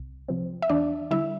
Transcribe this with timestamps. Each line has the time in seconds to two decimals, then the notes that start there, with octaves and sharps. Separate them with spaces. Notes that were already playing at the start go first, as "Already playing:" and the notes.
Already playing: C2
0.28 C3 F3 C4
0.62 E5
0.69 E2 D4 D5
1.11 D3 G3 E4 E5